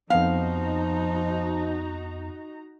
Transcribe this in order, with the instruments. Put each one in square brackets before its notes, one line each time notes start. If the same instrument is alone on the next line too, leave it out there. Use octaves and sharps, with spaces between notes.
[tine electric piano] F2 B3 [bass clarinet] F3 [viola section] D#4 F#4 A#5 [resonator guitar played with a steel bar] F5